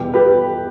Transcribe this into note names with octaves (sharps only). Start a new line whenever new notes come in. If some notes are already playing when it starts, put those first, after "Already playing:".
Already playing: E2 B2 G3 B3 G4
G4 B4